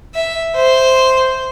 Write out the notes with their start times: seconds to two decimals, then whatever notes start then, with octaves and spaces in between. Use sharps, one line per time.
0.15 E5
0.55 C5